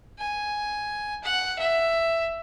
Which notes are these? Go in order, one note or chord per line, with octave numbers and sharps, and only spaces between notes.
G#5
F#5
E5